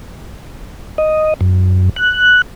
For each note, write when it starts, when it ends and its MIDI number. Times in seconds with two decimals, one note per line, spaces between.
0.98 1.34 75
1.41 1.89 42
1.96 2.42 90